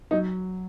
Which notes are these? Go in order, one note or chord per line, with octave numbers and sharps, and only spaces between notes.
F#3 D#4